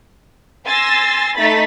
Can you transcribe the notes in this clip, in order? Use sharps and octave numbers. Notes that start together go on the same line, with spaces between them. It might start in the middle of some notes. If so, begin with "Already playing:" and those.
G#5 C6 E6 A6 A#6
A3 D#4 B5 A6 B6